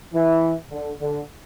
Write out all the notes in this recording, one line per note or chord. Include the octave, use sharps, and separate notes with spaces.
E3
D3
D3